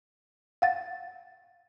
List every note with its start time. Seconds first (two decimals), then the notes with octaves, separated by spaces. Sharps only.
0.62 F5 F#5 A6